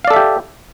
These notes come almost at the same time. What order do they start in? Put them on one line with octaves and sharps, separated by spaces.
F5 D5 A4 E5 G4